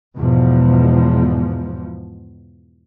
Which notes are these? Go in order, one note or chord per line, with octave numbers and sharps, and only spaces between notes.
E2 G#2 B2 F3